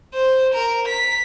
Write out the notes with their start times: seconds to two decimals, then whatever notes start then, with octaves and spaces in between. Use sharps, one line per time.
0.14 C5
0.54 A#4
0.88 B6